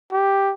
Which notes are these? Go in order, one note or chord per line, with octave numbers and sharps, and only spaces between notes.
G4